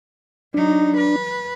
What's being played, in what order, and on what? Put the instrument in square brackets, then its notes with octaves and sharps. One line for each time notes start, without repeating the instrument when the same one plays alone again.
[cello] F#3 D#4 [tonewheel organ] D4
[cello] B4